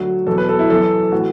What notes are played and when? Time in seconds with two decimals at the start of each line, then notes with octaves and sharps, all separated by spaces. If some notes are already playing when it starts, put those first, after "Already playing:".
Already playing: D2 D3 F#3 F#4
0.26 E2 B2 F#3 A4
0.38 B4
0.49 A4
0.59 E4
0.70 F#2 E3 A4
1.12 A2 E3 F#4